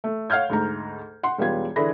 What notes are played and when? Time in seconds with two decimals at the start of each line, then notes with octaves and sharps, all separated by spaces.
0.04 A3
0.30 C#5 F5 F#5 F6 G6 G#6
0.49 D2 G#2 A#5
1.23 F#5 C6
1.38 E1 G3 B3 F4 G#6
1.76 D3 E3 D4 G#4 B5 A#6